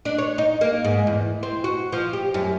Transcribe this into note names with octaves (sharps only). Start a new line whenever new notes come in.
D4
C#5
D#4
A#3
G#2
E2
C4
F#4
F3
G4
F#2